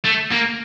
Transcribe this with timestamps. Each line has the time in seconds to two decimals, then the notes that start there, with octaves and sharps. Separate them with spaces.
0.05 A3
0.32 A#3